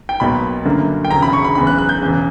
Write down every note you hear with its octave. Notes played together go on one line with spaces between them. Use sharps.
G5
B1 B2 A#3 B5
G1 F#2 D3 A#3
G5
E1 D2 C#3 A#5
B5
C#6
B5
F#1 E2 C#3 B5
F#6
F#6
G6
E1 E2 C#3